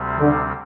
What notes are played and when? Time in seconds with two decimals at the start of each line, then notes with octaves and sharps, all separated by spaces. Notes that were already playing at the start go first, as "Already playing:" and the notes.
Already playing: D2 C3 G3 C4
0.19 D3